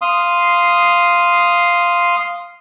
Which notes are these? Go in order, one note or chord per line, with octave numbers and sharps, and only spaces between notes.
F5 C6 D#6